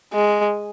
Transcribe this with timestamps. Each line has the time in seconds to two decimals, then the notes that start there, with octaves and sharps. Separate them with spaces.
0.14 G#3